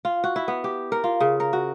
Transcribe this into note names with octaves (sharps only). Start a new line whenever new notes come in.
F4
F#4
E4
B3
G4
A#4
F4
C#3
A#4
F#4